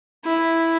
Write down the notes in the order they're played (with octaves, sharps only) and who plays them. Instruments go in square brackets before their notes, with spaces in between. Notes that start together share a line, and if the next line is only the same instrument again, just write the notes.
[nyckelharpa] E4